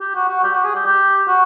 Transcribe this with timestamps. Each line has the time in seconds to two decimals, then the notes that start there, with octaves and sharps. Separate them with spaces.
0.01 G4
0.15 F#4
0.29 F#4
0.43 G4
0.54 F#4
0.64 G#4
0.75 G4
0.86 G4
1.28 F#4